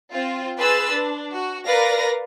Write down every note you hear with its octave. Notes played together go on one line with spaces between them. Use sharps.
C4 F4
G#4 B4 C6 E6 A6
D4
F#4
A#4 B4 D5 F5 A#6